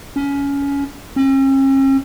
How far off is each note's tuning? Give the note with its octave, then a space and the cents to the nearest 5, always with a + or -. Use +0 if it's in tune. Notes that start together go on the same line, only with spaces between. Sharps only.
C#4 +20
C#4 -45